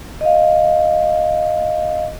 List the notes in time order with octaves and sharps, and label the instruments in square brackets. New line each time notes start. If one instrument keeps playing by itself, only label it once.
[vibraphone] D#5 F5